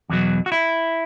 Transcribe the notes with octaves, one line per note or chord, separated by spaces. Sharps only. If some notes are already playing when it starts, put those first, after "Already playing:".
E2 B2 F#3
F#4
E4